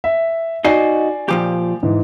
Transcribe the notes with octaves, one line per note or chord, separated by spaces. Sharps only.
E5
D#4 F#4 D5 D#5 G#5 C7
A#2 F3 G4
G#2 E3